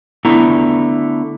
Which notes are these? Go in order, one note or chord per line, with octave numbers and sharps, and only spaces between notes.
D3 A3 B3 E4 A#5